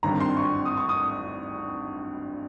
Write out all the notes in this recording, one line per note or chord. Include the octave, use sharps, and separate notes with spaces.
G#1 G2 D#3 G3 C4 A#5
C6
C#6
D#6
C#6
D#6